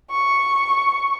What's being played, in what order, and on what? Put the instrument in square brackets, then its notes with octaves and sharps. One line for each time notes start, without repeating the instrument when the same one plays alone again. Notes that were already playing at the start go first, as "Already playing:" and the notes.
[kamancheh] C#6